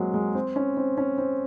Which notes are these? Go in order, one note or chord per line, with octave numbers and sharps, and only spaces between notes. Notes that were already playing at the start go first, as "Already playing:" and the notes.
Already playing: F#3 G#3 A#3 C4
G#3
C4
C#4
C4
C#4
C4